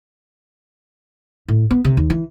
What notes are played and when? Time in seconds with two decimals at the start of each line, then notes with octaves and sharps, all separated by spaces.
1.48 A2
1.71 B3
1.84 C3
1.97 D#2
2.10 E3